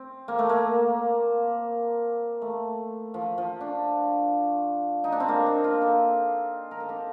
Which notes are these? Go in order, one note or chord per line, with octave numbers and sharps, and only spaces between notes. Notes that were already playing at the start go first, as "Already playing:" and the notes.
Already playing: C4
A#3
A3
A#3
A3
F3
F3
D4
D#4
D4
C4
A#3
D#4
F4
A4
A#4
A4
G4